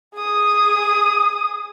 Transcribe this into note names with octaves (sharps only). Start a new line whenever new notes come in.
G#4 D#6